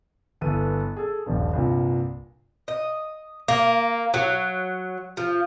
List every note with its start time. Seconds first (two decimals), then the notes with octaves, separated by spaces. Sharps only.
0.41 G1 E4 A4 B4 D#7
0.97 G#4 A4
1.26 D#1 A#1 G2
1.53 C2 G2 A#2
2.68 D#5
3.48 A#3
4.14 F#3
5.17 F3